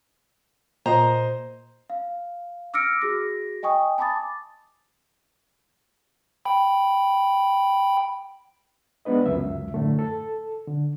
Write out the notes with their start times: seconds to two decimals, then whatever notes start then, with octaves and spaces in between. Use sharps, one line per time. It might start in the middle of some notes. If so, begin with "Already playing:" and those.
0.86 A#2 C5 D#5 A#5
1.90 F5
2.74 D6 E6 F6 A#6 C#7 D7
3.02 F#4 G#4 A#6
3.63 D#5 G5 G#5 C#6 D#6
3.98 G#5 A5 B5 D6 D#6 A6
6.45 G5 B5
9.05 G#3 B3 D4 B4 D#5
9.26 C#2 F#2 E5
9.74 F#2 A2 D3 A3
9.99 A4
10.67 D3